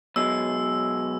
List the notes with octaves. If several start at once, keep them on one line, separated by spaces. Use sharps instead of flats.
B1 B2 G#3 E6